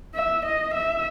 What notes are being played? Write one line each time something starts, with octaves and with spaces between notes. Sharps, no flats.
E5
D#5
E5